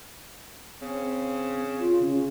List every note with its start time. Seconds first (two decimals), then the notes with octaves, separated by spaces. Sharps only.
0.81 C#3 C4
1.80 F4
2.00 C#3